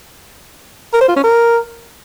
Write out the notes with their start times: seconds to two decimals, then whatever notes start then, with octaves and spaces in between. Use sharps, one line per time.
0.93 A#4
1.01 C5
1.08 F4
1.16 C#4
1.24 A#4